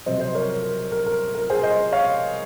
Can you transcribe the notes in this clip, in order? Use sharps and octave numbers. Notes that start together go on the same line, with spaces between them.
F2 C3 F#3 C5 D#5
C5 D#5
A#4 C#5
A#4
A#4
A#4
A#4
A#4
G#4 C5
C5 D#5
C#5 F5